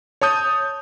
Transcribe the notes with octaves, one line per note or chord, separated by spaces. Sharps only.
C#5 A5 D#6 G6